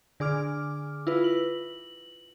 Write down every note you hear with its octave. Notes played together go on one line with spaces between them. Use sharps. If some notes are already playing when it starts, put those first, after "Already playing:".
D3 G#4 D6 F6
E4 F4 B4
F#7